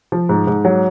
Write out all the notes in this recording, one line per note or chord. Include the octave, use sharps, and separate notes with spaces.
F3
G#2
G#2
F#3